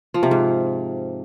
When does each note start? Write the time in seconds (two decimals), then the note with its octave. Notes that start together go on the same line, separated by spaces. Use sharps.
0.14 F3
0.23 C3
0.31 G#2